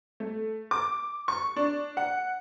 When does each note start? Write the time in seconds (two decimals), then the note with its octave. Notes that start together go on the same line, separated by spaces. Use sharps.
0.20 A3
0.71 D6
1.28 C#6
1.56 D4
1.97 F#5